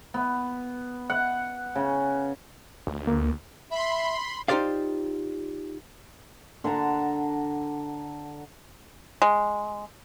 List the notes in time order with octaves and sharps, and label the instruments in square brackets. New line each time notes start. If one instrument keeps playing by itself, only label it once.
[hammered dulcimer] B3
F#5
C#3
[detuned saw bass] D2
[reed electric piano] A#3
[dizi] E5 [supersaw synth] B5 C6
[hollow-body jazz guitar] D#4 F4 G4 C5 D5 F5
[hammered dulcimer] D3 F#5 A5 A#5
[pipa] G#3